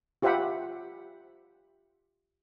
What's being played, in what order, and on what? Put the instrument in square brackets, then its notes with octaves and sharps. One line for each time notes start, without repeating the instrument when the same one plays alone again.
[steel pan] F4 G4 C5 E5 F#5 B5